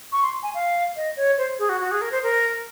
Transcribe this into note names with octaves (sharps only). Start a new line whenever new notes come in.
C#6
C6
G#5
F5
D#5
C#5
C5
G#4
F#4
F#4
G#4
A#4
C5
A#4